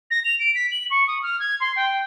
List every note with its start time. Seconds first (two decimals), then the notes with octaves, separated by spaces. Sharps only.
0.10 A#6
0.24 F7
0.39 D7
0.55 B6
0.71 F#7
0.90 C#6
1.07 D#6
1.22 F6
1.39 G#6
1.60 C6
1.76 G5